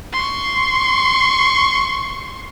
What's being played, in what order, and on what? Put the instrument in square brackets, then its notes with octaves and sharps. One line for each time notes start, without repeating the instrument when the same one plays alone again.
[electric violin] C6 C#6